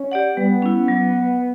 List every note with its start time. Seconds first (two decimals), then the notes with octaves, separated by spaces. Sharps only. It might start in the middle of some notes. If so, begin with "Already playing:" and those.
Already playing: C#4
0.11 G4 D5 F#5
0.37 G3 B3
0.62 C#4 E4
0.88 F#3